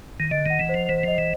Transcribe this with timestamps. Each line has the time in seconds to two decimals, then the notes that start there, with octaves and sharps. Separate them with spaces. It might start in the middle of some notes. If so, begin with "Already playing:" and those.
0.20 D#3
0.31 D3 D#5
0.46 D#3 F#5
0.59 E3
0.69 C5
0.74 F3
0.89 E3 C5
1.03 F3 D#5
1.18 E3